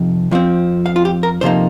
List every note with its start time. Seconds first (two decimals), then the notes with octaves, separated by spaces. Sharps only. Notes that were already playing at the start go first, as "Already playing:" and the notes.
Already playing: F2 C3 F3 D#4
0.31 F2 F3 C4
0.86 F5
0.96 F4
1.05 G4
1.23 A#4
1.41 F2 C3 F3 A#3 D#4 C5